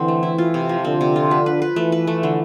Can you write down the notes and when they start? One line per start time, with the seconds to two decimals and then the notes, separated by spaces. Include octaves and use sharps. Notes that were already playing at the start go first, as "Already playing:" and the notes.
Already playing: D3 E3 C4
0.08 A3
0.23 E4
0.38 F4
0.54 C3
0.69 F3
0.85 D3 C4
1.01 C3
1.16 F4
1.31 B4
1.46 B4
1.62 B4
1.76 E3 A3
1.92 B4
2.07 A3
2.23 D3